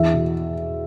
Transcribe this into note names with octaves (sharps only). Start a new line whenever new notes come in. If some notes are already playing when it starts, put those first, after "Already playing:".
Already playing: E2 E5
B2